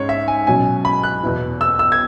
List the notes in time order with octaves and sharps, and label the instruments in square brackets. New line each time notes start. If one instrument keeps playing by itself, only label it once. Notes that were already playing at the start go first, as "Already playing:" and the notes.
Already playing: [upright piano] G#2 G#3 C#4 [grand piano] C#5
[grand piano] E5
G#5
[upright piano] B2 F#3 C#4 [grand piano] G#5
[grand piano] B5
F#6
[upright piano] E2 B2 B3 E4
[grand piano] E6
E6
G#6